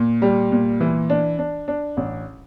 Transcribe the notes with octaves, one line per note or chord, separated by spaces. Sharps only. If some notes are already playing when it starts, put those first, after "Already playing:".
Already playing: A#2
G3
A#2
E3
D4
D4
D4
A1